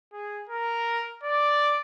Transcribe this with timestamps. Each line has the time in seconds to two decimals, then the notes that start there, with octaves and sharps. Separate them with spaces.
0.13 G#4
0.49 A#4
1.23 D5